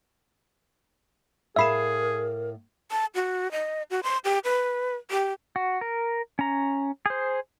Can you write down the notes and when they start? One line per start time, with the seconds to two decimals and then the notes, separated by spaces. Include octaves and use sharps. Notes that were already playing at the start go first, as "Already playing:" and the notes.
1.56 A2 G#4 A#4 E5 F5 B5 E7
2.91 A5
3.15 F#4
3.52 D#5
3.90 F#4
4.03 C6
4.25 G4
4.44 B4
5.11 G4
5.56 F#4
5.81 A#4
6.39 C#4 A#5
7.06 G#4 C5